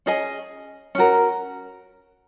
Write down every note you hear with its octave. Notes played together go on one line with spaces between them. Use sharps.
C#4 G#4 D#5 G#5
C#4 F#4 A#4